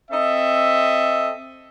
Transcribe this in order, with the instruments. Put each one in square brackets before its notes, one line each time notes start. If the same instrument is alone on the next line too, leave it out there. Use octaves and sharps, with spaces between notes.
[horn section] C4 A4 D#5 E5